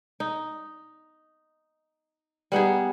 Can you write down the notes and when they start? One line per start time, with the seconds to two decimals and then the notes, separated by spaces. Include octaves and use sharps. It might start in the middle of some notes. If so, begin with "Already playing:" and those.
0.20 D#4
2.52 G3 B3 D#4 G#4